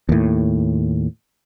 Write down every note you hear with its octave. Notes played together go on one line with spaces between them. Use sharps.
D#2 A2